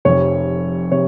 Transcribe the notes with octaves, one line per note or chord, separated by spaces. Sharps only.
F1 F2 C3 C#5
C3 C#5